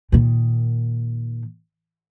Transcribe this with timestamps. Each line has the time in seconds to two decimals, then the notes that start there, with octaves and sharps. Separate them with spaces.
0.12 A#2 D#3